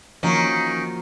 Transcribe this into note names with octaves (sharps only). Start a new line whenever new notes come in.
D#3 F3 A#3 C#4 F#4